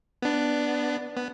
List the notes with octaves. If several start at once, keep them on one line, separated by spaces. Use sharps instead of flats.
B3 D4
B3